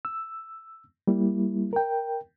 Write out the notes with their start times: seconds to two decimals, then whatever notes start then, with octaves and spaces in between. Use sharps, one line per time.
0.05 E6
1.07 G3 A#3 E4
1.73 A#4 G5